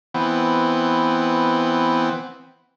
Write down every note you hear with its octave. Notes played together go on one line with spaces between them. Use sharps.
E3 B3 C4